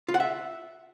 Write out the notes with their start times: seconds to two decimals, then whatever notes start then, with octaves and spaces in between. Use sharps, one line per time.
0.08 F4
0.14 F#5
0.20 E5